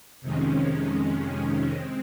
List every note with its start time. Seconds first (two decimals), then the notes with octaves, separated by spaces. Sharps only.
0.22 F2 C3 D#3 G#3 C#4
1.71 G#3 C4